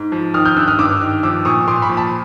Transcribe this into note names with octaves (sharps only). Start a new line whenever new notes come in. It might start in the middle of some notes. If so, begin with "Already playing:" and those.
Already playing: G#2
F3
D#3 D#6 F6
F6 G6
G2 E6 F#6
D#6 F6
G2 D6 E6
D#3
F3 D6 E6
A#2 C#6 D#6
A#2 C6 D6
B5 C#6
F3
A5 B5